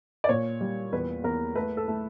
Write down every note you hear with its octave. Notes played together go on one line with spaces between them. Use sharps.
D5
A#2 C#5
G3
E2 B4
E2 A#4
A3 B4
A4
A3